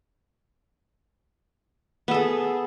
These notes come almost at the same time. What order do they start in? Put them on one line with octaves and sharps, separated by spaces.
B3 A4 G#4